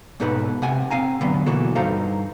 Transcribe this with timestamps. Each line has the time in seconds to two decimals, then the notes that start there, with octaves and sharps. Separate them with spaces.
0.20 G#2 B2 D#4 A4 B4 B5
0.62 C3 F#5 G#5
0.91 C4 F5 G#5 A#5
1.21 D3 F#3 B3
1.46 B2 E3 A#3 F#4 A4
1.75 G2 D#4 A4 C5 F5 A#5